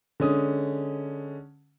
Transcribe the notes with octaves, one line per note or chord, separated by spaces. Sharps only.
D3 G#3 C#4 D#6